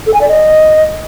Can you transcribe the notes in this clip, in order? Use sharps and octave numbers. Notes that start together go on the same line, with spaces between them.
A4
G#5
D5
D#5